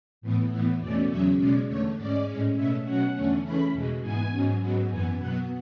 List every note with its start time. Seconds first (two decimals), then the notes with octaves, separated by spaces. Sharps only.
0.21 A2 E3 B3
0.51 A2 E3 B3
0.80 E2 B2 A3 C#4 D5
1.09 E2 C#3 F#3 C#4 E5
1.38 B2 G#3 C#4 D5
1.67 E2 D3 A3 C#5
1.97 G#2 G#3 C#4 D5
2.26 A2 G#3 C#4
2.56 B2 A3 C#4 E5
2.85 B2 F#3 C#4 F#5
3.14 E2 D3 A3 C#4
3.43 C#3 E3 A3 C#4 B5
3.72 E2 B2 G#3
4.01 G#2 E3 B3 G#5
4.31 G#2 F#3 C#4
4.60 G#2 F#3 B3
4.89 F#2 E3 B3 G#5
5.18 B2 F#3 B3 F#5